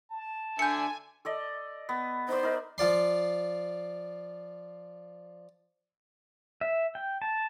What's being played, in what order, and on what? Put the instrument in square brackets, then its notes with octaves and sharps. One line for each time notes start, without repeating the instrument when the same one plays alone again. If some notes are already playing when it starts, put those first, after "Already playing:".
[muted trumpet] A5
[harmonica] D3 E5 [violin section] G#5 [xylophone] G6 C#7
[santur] A4 D5 D#5
B3
[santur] D#4 D5 [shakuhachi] C5
[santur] D#4 A#4
[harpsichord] F3 F4 D5 C6
[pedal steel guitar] E5
G5
A5